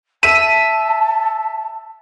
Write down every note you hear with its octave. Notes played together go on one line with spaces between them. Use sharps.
E5 A5 D#7